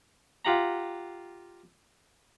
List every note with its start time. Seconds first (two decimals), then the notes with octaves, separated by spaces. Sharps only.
0.45 F4 G4 F#5 A#5